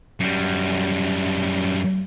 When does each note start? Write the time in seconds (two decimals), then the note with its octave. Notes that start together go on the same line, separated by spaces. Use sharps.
0.20 F#2 G3